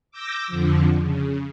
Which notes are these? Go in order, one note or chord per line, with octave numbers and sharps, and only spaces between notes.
D6 E6 G6 A#6
F2 D3 F3
C#3